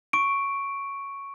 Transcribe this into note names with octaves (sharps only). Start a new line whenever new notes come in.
C#6 D7